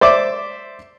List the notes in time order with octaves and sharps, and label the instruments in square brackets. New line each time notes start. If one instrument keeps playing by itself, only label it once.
[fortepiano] C5 D5 E5 D6